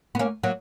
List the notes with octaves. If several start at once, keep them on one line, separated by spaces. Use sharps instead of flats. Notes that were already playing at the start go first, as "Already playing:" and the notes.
B3
A#3 C#4
F#3 A#3